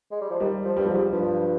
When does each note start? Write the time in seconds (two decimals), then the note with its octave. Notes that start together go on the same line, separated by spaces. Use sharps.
0.12 G#3
0.21 G3
0.30 F3
0.40 D#3 G3
0.65 F3
0.77 G2 G3
0.86 F3
0.89 G#2
0.93 G3
1.13 G2 F3